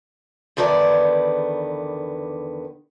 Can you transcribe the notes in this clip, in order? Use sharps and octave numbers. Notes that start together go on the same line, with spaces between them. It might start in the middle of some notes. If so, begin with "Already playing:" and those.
E2 D3 D#3 B3 D5